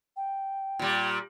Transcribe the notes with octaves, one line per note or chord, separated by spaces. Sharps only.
G5
A#2 G3